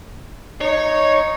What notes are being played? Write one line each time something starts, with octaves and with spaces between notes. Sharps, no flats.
D#4 C#5